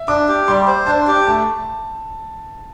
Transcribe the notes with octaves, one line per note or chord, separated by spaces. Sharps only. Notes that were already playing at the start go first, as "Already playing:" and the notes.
Already playing: E5
D4 D6
G4
G3 C6
C5
D4 A5
G4
A3 A5